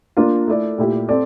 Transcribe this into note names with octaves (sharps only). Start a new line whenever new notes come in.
A#3 D4 F4 A#4
A3 E4 A4 D5
A#2 A3 E4 G4
C4 A4 D5